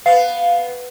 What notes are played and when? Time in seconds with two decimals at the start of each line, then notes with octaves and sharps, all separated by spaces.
0.06 B3 F5